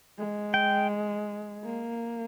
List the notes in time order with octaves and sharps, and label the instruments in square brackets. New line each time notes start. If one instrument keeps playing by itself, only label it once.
[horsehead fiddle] G#3
[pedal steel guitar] G5
[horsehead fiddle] A#3